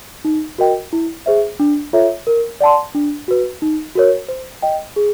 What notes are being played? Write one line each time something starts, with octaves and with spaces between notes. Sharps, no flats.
D#4
F#4 A#4 D#5 G5
E4
G#4 C5 E5
D4
F4 A4 C#5 E5
A#4
D5 F#5 A5 C6
D4
F#4 B4
D#4
F#4 A#4 C#5
C5
D#5 G5
G#4